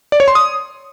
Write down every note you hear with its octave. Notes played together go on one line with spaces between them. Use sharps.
D5
C#5
C6
D#6